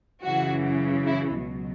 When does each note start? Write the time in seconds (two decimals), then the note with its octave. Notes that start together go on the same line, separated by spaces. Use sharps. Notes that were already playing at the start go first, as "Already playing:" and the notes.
0.22 F#2 C#3 E3 F#4
1.07 E4
1.35 C#2 B2 F#3